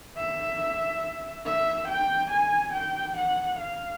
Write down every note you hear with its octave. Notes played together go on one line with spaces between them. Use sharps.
E5
E5
G5
G#5
G5
F#5
F5